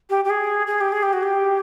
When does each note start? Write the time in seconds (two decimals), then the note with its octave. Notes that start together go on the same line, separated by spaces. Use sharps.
0.10 G4
0.25 G4
0.30 G#4
0.67 G#4
0.81 G4
0.92 G#4
1.03 G4
1.13 F#4
1.23 G4